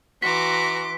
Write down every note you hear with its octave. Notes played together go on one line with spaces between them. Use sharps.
E3 F#4 A#5 C6 D6 B6